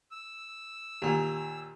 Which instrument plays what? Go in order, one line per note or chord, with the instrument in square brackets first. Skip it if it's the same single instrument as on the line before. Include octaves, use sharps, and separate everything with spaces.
[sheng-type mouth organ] E6
[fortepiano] D#2 A#2 [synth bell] G4 G#5